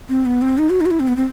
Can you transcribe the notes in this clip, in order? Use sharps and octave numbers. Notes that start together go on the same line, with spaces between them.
C4
B3
C4
D#4
F#4
D#4
F#4
E4
C4
B3
C4